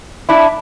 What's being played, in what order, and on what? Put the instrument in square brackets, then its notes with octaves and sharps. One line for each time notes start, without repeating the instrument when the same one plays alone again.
[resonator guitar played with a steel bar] D4 E4